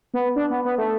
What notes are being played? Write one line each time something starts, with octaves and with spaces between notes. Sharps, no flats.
B3
D4
B3
B3
A3